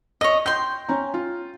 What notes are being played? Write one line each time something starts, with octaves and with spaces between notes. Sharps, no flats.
C#5 D#5 A#6
G5 C6 G6
C#4 A#5
F4